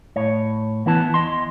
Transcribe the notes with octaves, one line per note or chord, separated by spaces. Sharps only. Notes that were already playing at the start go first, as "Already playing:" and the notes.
A2 C#5
E3 B3 E4 B4 A5
E2 D#5 C6